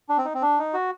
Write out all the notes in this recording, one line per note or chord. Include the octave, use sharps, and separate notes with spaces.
D4
C4
D#4
C4
D4
D#4
F#4